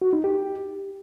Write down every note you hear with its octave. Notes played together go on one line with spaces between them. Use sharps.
F#4
D#4
G4